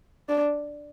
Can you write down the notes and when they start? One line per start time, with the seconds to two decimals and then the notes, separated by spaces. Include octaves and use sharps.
0.29 D4